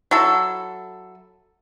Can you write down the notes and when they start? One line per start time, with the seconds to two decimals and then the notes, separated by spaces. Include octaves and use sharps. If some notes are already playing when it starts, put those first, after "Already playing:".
0.11 F#3 E4 A4